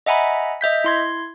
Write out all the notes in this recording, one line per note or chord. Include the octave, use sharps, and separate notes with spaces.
D#5 E5 F#5 G#5 A#5 B5
D#5 E5 G6 B6
E4 C6 G#6